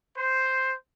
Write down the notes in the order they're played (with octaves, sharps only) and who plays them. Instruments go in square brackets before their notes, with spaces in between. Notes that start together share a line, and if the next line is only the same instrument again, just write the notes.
[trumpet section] C5